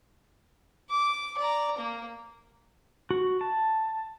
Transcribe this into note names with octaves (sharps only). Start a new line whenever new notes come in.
D6
D5 A#5
A#3 A#4
F#4
A5